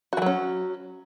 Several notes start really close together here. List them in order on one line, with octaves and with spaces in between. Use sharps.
F#4 E3 F#3 C#4